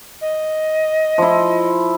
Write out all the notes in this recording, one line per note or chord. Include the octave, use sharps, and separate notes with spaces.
D#5
F3 E4